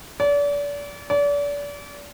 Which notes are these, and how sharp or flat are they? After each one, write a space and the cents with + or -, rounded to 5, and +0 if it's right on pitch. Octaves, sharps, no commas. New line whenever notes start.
D5 -35
D5 -35